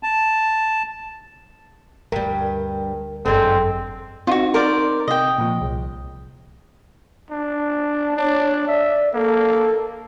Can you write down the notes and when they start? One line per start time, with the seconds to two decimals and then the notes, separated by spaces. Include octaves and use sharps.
0.03 A5
2.12 D2 G2 G3 A#4
3.26 G1 F#2 D3 G#3 C4 A4
4.27 C4 D#4 F4 F#4
4.54 A#4 C5 D5
5.08 C3 D#5 G5
5.38 A#2 F3
5.61 C2
7.30 D4
8.17 D4 C#5
8.68 D5 E5
9.14 A#3 A4